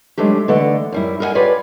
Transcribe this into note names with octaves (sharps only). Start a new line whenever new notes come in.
F#3 G#3 A3 D4 G4
D3 E3 A3 D5 D#5 F#5
F#2 G3 E4
A#4 B4 D#5 F#5 G#5
F4 G4 B4 C#5 D5